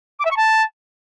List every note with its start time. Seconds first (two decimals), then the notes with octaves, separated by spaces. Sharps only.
0.19 D6
0.25 E5
0.31 C#6
0.37 A5